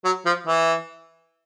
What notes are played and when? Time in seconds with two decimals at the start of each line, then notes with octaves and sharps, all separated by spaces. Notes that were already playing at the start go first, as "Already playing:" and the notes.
0.05 F#3
0.25 F3
0.47 E3